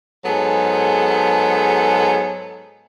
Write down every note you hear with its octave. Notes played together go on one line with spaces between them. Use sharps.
G#2 F#3 B3 G#4 A4